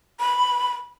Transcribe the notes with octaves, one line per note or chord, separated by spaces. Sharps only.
B5